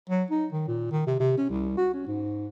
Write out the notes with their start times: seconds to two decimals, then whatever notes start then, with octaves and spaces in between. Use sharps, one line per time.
0.10 F#3
0.30 D#4
0.53 D#3
0.68 A#2
0.92 D#3
1.07 C3
1.20 C3
1.38 C#4
1.50 C2
1.77 F#4
1.94 C#4
2.07 G#2